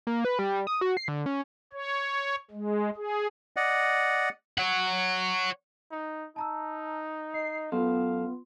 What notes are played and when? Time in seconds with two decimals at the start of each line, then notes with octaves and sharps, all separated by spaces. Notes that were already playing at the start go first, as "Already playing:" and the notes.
0.07 A#3
0.25 B4
0.39 G3
0.67 D#6
0.81 F#4
0.97 C7
1.08 D3
1.26 C#4
1.73 C#5
2.51 G#3
2.96 G#4
3.56 D5 D#5 F#5
4.58 C#5 F#5
5.91 D#4
6.36 D#4 A5 A#5 E6
7.34 D#5 C7
7.72 F#2 B3 F4 A4 F5 C6